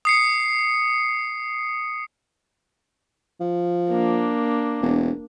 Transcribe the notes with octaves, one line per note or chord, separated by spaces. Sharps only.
D#6 C7 C#7
F3
A#3 D4
E1